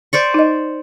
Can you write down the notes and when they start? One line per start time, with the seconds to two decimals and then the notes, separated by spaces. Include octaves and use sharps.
0.13 C5 D5 C#6
0.34 D#4 D#5